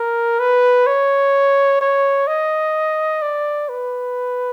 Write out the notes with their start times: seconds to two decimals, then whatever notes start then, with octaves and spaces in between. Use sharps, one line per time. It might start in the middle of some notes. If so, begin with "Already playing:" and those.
Already playing: A#4
0.40 B4
0.87 C#5
1.81 C#5
2.28 D#5
3.22 D5
3.69 B4